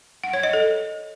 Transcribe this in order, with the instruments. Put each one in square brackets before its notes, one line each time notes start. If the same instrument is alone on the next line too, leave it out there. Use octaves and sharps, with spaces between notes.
[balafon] F#5
C#5
D#5
A4